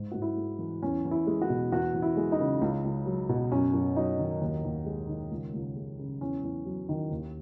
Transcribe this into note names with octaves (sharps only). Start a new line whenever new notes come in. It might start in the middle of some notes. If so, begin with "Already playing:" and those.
Already playing: G#2
G#2 F#4
E4
G#3
E3
E2 C#4
E2
E4
G#3
F#4
B2
E2 F#4
E2
E4
G#3
D#4
C#3
C#2
C#2
F#3
B2
F#2 C#4
F#2
F#3 D#4
D#3
D#2
D#2
G#3
D#3
C#2
C#2
G#3
C#3
E2 C#4
E2
F#3
D#3
D#2